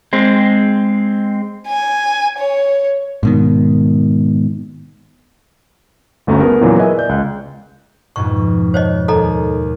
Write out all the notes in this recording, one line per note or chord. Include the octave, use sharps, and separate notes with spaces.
G#3 C4
G#5
C#5
G#2 B2 D#3
G1 D2 A3 C#4 F#4 A#5
B3 G#4 A#4
E2 A#2 C#3 E3 F#3
A#4 B4 D#5 E5 G#5
D5 G6
C#2 F#6
F2 G#2 B2 C#6
C5 C#5 D#5
D#2 A4 D#5 A#5